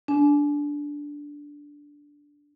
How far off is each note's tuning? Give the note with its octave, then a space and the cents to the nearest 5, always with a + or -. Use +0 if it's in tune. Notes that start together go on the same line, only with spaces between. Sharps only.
D4 -10 G#5 +35